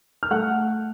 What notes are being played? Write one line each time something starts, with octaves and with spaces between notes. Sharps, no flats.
F6
A3 F#5 F#6